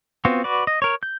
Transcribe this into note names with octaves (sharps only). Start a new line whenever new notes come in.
B3 C4 F4 F#4
F#4 B4 D5
D#5
A#4 C#5
G6